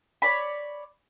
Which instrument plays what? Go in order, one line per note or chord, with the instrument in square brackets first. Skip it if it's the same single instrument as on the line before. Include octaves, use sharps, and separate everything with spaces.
[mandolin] C#5 D5 B5